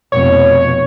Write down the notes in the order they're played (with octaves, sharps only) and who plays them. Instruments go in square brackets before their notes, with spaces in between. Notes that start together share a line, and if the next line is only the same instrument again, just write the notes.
[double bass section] F1 F2 B2 [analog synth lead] C#5